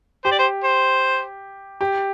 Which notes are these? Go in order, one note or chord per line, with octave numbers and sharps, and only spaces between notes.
G4 C5
D5
C5
C5
G4